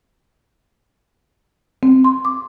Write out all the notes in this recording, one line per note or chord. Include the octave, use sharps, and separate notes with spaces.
C4
C6
D6